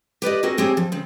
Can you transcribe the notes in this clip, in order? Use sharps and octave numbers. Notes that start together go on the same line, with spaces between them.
G4 B4 D5 D#5
C4 F#4 G#4 A#4
D2 C4 G4 G#4 C#5
F3
C#3 C4